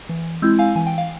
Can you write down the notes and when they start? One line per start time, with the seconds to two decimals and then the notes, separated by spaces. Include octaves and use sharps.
0.09 E3
0.42 G#3 C4 E4 E6 G6
0.59 F5 G#5
0.76 E3 G#5
0.87 G5
0.98 F5